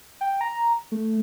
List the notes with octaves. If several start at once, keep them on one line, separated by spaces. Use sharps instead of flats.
G5
A#5
A3